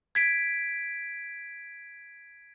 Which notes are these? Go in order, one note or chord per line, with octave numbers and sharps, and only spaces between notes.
G#6 B6 D7